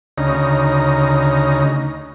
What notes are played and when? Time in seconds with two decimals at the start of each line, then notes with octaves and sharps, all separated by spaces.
0.18 D2 C#3 D#4 A#5